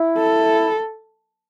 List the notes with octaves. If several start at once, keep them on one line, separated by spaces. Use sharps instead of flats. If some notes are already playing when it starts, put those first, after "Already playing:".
Already playing: E4
A4